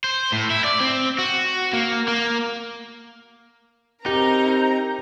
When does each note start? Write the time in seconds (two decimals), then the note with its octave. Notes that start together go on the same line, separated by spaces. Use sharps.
0.04 C5
0.32 A2
0.50 E4
0.64 D5
0.81 C4
1.19 F#4
1.73 A#3
2.08 A#3
4.06 C4 D#4 G4 A#4 A#5